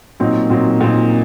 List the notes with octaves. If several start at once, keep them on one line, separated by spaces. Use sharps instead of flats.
A#2 F#3 C4 D#4
A#2 F#3 C4 D#4
A#2 F#3 C4 D#4